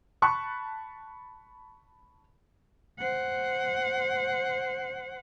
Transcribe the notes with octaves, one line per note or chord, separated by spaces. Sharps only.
A5 B5 C#6 F#6
C5 F#5